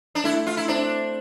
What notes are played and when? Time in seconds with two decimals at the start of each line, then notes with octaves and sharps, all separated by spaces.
0.15 D4
0.24 A3 E4
0.47 F4
0.57 E4
0.68 C4 D4